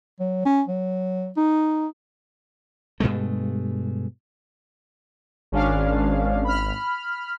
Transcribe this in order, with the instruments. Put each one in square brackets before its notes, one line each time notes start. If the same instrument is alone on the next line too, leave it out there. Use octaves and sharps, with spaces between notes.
[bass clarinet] F#3
C#4
F#3
D#4
[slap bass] G2 B2 G#3 A3
[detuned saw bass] G#1 [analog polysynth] C#4 D4 F5
[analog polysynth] B5 F6